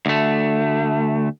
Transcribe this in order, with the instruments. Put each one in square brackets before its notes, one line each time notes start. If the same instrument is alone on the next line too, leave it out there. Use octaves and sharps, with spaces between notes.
[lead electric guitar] D2 A3